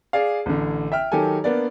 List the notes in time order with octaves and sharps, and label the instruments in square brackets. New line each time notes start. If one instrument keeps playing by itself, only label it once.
[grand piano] G#4 D5 F5
A1 D3
E5 G5 F6
D#3 F#3 G4 A4 G#5
A#3 B3 D4 D5